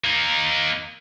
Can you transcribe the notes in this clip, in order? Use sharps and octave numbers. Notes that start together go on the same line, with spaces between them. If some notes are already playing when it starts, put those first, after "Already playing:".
A#3 D#4